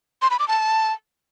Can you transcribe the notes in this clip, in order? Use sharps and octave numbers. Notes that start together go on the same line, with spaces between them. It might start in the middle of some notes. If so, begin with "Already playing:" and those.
C6
B5
D6
A5